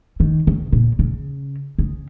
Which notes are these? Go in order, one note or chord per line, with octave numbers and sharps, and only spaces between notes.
D#3
C#3
A#2
C#3
C#3